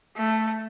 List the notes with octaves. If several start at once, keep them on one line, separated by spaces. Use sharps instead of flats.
A3